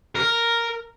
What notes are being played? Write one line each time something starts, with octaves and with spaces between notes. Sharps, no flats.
A#4